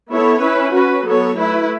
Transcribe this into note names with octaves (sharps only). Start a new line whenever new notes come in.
B3 E4 A4 C#5
C#4 E4 B4
C#4 F#4 B4
F#3 B3 A4 C#5
A3 E4 B4